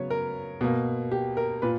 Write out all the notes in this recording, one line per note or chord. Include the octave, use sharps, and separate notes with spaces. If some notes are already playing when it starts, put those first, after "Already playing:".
Already playing: C#3 F#3 B3 C#5
A#4
B2 A#3
G4
A#4
A#2 B4